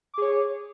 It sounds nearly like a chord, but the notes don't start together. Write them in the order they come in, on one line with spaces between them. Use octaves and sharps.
D6 G#4 C#5